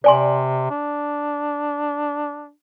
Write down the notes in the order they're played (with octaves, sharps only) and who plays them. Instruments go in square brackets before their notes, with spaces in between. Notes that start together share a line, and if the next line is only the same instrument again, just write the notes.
[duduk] C3 [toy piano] D5 G#5 C6
[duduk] D4